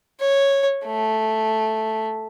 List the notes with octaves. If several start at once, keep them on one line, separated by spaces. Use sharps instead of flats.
C#5
A3